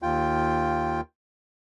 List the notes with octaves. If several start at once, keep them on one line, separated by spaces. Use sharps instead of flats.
D#2 F4 G5